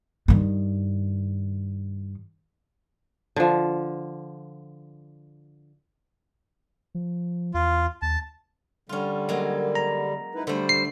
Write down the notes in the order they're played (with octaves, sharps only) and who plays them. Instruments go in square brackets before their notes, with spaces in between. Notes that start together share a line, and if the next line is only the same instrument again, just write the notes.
[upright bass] G2 D#3
[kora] D3 F3
[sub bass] F3
[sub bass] E2 [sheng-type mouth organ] F4
[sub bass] D#2 [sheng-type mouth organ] A5
[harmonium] D3 G3 [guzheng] C#4 F4
[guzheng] F#3 G#3 A#3
[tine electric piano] A#5
[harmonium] D#4 E4 B4
[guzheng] D3 A3 [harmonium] G3 C5
[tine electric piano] C7